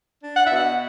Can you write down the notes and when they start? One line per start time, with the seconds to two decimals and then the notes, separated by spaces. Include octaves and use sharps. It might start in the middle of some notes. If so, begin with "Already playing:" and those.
0.22 D4
0.36 F#5
0.46 E5
0.52 B2 F#5